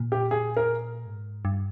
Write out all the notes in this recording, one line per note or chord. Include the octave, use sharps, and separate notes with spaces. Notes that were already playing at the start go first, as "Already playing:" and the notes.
Already playing: A#2
G4
G#4
A#4
G#2
G2